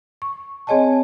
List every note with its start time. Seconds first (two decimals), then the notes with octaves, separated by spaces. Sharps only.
0.22 C#6
0.67 C4 G#4 C#5 D#5 G#5 A5